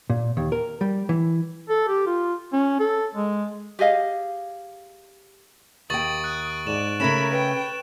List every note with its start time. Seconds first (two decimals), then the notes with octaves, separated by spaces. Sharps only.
0.10 A#2
0.37 D#2
0.52 A#4
0.81 G3
1.09 E3
1.69 A4
1.88 G4
2.06 F4
2.53 C#4
2.80 A4
3.15 G#3
3.79 G4 G#4 D#5 F5
5.90 D#2 G5 C#6 D#6 A6 F#7
6.24 F#6 D7
6.67 G#2 D5 E7
7.00 C#3 A3 C#4 A#4 B5 E7
7.32 B4 G5